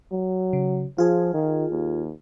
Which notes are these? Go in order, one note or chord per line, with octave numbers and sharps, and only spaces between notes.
F#3
C#3
F3 F4 G#4
D#3
D#2